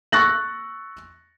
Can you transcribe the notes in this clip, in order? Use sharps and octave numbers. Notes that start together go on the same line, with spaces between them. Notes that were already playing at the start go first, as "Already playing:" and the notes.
C#6 E6 F#6 A6 A#6 F#7